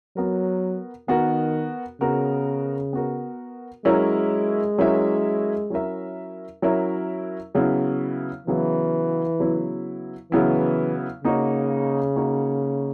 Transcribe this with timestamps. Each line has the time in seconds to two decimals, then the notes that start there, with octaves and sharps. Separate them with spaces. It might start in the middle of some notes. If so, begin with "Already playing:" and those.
0.16 F#3 B3 F#4 A#4
1.08 D#3 B3 F#4 A#4
2.01 C#3 B3 F#4 A#4
2.93 B3 F#4 A#4
3.85 F#3 G#3 C#4 E4 A#4 E5
4.78 F#3 C#4 E4 A#4 E5
5.70 F#3 C#4 E4 A#4 E5
6.62 F#3 C#4 E4 A#4 E5
7.55 C#3 F#3 B3 E4
8.47 C#3 E3 F#3 B3 E4
9.39 C#3 F#3 B3 E4
10.31 C#3 E3 F#3 B3 E4
11.23 C#3 A#3 D#4 F#4 C#5
12.16 A#3 D#4 F#4 C#5